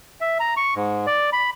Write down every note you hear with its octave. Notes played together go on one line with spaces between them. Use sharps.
E5
A#5
C#6
G#2
D5
B5